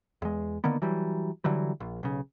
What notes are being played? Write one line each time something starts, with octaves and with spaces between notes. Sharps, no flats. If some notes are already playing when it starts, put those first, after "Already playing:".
E2 G#3
D3 D#3 A#3 B3
E3 F#3 G3
D3 E3 F#3 G3
A#1
B1 C#3